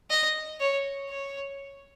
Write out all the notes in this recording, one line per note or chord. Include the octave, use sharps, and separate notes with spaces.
D#5
C#5
C#5